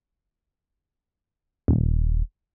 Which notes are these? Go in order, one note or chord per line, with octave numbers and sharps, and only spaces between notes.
D#1